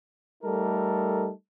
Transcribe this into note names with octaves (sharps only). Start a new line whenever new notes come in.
G3 A3 D#4 A4 A#4